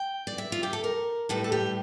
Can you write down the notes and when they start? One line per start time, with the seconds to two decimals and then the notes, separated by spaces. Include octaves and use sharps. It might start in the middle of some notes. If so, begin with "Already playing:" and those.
Already playing: G5
0.27 D5
0.38 E5
0.52 F4
0.63 G4
0.73 A4
0.84 A#4
1.29 A2 E3 G3 A4
1.44 A4
1.52 G4